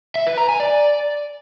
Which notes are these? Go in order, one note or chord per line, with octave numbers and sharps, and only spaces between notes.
E5
B4
A#5
G#5
D5